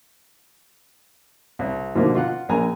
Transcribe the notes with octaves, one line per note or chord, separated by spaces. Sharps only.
C2
B2 D3 D#3 F3 A#3
F4 F5 F#5
A#1 A#4 G#5 A#5